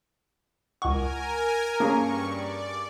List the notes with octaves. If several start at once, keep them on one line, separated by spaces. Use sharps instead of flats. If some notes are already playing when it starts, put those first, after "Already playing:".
C#2 A#4 F#5 G#5 C#6
G2 A#3 C#4 G#4 A#5 C#6
D5